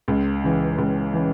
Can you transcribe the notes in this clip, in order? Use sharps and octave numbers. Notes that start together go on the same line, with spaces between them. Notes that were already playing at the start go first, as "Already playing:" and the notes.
C#2
C#3 E3
C#2
C#3 E3